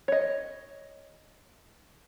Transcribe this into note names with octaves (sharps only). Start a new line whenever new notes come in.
C#5 D#5